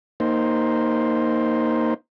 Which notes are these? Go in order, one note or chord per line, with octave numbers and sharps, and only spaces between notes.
A#3 D#4 C5